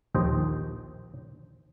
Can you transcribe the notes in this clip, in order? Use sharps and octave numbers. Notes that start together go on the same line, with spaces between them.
A#1 D#2 C5 D#5 G5